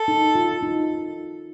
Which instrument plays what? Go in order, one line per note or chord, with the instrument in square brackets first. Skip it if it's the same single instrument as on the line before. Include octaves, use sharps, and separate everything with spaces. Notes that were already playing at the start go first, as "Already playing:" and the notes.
Already playing: [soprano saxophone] A4
[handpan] D#4
F4
D#4